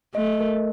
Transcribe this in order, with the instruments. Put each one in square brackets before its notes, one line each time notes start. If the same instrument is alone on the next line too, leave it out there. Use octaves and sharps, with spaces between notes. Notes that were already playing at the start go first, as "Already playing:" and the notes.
[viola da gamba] A3 [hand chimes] D#5
[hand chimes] A#4